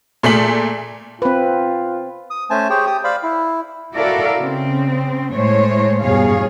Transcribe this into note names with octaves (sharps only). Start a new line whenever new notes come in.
A#2 A3 G#4 B6 F#7
C4 F4 B4
D#6
A3 C#4 C5 G#5 A5
G4 G#4 C5 C#5 G5
G4 G5 D#6
C5 D5 F5 B5
E4
E4 F#4 A4 A#4 D5 F5
C#3 C4
A2 G#3 A3 C5 C#5
E2 G2 B2 G#4 C#5 F5